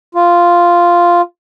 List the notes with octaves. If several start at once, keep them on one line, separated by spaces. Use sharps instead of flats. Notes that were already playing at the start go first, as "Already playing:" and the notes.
F4